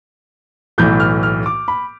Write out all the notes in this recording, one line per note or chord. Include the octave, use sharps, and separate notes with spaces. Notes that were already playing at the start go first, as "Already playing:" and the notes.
B1 A2 E3 G6
F6
F6
D6
B5